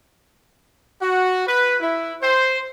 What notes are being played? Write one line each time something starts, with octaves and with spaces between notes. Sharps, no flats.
F#4
B4
E4
C5